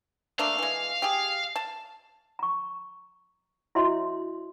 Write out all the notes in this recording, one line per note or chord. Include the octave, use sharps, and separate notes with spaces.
A3 A#3 D4 F5
E3 G#3
G4 G#4
A5
A#5 C#6
E4 F#4 C#5 D#5 E5 C6